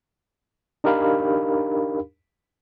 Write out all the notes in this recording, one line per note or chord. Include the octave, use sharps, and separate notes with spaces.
D4 D#4 G4 A#4 F5 B5